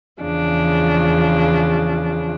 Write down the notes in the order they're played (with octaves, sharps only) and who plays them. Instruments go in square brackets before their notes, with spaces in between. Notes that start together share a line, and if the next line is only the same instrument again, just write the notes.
[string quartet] E2 C#3 F3 D4